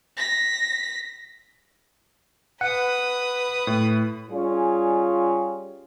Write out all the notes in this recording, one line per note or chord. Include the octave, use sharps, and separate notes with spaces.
A#6 B6
B4 F#5 D#6
A2
G3 C#4 F4 G#4